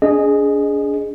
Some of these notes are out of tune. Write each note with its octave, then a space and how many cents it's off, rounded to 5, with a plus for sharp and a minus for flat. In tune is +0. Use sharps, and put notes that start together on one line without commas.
D4 -40 G#4 +5 D#5 -25